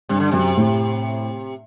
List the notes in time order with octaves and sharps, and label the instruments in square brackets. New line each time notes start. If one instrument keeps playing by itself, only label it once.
[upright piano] G2 [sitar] C3
[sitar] D3
[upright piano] F#2 [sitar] C3
[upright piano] A2